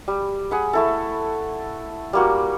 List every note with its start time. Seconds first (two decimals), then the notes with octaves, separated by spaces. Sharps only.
0.08 G3
0.51 G#4 F#5 B5
0.73 A3 E4 A4
2.13 G3 A#3 F#4